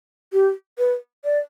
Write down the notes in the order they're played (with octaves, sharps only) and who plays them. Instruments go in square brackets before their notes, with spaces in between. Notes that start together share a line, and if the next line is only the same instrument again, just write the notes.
[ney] G4
B4
D5